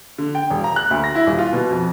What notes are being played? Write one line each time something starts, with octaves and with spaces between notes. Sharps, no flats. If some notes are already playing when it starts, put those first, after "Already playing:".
D3
G5
E1
A#5
F#6
D2
A#6
E4
D#1
F4
B2
F2